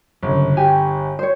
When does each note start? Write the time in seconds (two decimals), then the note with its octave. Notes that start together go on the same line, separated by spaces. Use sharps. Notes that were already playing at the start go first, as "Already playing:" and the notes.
0.23 G1 F#2 C#3
0.57 G4 G#5
1.19 C5 C#5